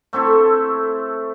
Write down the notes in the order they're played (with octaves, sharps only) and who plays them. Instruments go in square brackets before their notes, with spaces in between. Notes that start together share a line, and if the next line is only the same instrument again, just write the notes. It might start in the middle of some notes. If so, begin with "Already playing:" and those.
[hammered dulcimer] A3 C4 E4 A4